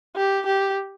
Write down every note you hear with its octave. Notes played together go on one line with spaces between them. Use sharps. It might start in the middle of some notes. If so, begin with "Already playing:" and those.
G4
G4